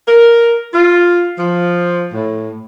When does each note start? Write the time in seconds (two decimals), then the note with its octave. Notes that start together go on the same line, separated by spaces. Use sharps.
0.08 A#4
0.73 F4
1.38 F3
2.14 A2